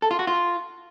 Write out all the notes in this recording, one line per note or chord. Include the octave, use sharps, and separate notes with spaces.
A4
F4
F#4
F4